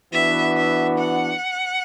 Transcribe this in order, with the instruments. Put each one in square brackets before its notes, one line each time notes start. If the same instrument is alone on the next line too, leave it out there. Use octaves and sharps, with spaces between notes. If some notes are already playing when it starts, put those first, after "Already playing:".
[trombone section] E3 B3 D4 F#4 [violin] E5
[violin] E5
F#5